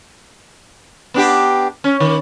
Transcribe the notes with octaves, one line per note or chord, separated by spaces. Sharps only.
B3 D4 G4
C#4
D#3